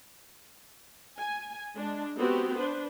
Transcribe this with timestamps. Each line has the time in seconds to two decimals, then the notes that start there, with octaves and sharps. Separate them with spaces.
1.19 G#5
1.76 G#3 D4
2.18 B3 C4 F#4 G4
2.57 D4 B4 C5